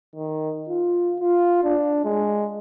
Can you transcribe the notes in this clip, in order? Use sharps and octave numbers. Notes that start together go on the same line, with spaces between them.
D#3
F4
F4
D4
G#3